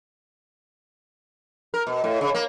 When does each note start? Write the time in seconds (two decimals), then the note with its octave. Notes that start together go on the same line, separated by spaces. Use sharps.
1.74 A#4
1.87 B2
2.04 A2
2.21 C#3
2.34 A#3